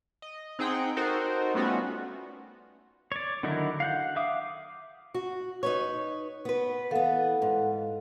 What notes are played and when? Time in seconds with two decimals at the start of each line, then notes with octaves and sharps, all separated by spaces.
0.22 D#5
0.59 C4 D#4 G#4 F#5 G5
0.97 D#4 F#4 A4 A#4 C5
1.54 G3 A3 B3 C#4 F4 F#4
3.12 C#5 D5
3.43 D3 D#3 F#3 D#4 E4
3.80 F5 F#5 G6
4.16 E5 F5 D6 D#6
5.14 F#4
5.63 D#4 B4 C#5
6.45 B3 B4
6.91 E3 B3 A4 F5 F#5
7.42 G#2